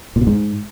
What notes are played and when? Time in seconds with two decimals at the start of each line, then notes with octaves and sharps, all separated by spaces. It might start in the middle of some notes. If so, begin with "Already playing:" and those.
0.16 A#2
0.21 B2
0.27 G#2